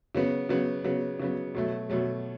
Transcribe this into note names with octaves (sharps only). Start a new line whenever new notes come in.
C#3 F#3 B3
C#3 F#3 B3
C#3 F#3 B3
C#3 F#3 B3
B2 F#3 A3
B2 F#3 A3